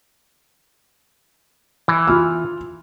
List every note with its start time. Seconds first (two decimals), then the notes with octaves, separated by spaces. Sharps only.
1.88 E3
2.07 F4 F6